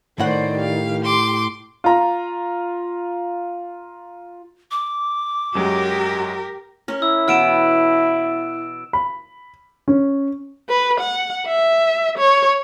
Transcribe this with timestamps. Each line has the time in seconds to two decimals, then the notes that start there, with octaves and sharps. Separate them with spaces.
0.20 A2 D#3 C5 D5 F#5
0.60 G4 F5
1.04 C6 D6
1.84 F4 A#5
4.71 D6
5.55 F#2 F#3 G#3 G4 A#4
6.88 C#4 A#4
7.02 E4 E6
7.28 B2 E3 B3 F6 D7 E7
8.93 B5
9.88 C#4
10.69 B4
11.00 F#5
11.47 E5
12.18 C#5